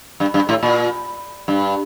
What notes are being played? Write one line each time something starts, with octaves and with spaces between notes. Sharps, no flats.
G2
G2
A2
A#2
G2